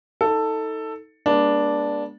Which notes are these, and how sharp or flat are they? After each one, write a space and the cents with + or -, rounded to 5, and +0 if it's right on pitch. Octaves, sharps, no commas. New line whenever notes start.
D#4 +30 A4 +10
G#3 +0 B3 -40 D4 -5